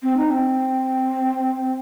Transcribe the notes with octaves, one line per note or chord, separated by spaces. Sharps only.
C4
D#4
C4